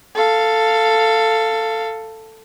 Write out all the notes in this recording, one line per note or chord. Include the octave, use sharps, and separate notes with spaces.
A4 F5